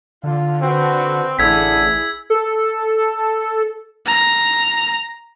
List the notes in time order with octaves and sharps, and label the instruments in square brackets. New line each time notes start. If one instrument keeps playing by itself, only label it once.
[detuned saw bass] D3 [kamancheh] F4
[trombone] C4 [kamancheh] F#4 B4
[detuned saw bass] A1 [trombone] D3 [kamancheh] E4 G#4 [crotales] E6 G#6 B6
[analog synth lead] A4
[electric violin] A#5